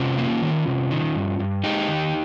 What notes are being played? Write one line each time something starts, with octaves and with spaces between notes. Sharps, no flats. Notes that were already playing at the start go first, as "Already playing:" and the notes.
Already playing: C3 C#4 F4
A#3
D#3
C3
D#3
G2
G2
G#3 D#4 G4
D#3